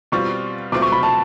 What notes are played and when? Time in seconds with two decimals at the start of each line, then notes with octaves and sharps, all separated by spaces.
0.12 B2 G3 C4 F4 C#6
0.72 B2 F#3 A3 C4 F4 D6
0.82 C#6
0.92 B5
1.03 A5